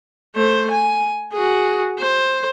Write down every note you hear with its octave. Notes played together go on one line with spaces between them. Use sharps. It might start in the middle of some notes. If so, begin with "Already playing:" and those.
A3 C5
G#5
F#4 G#4
C5